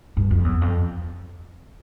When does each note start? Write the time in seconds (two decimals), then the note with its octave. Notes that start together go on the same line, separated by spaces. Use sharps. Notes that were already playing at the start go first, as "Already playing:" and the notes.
0.17 G2
0.31 F2
0.44 E2
0.62 F2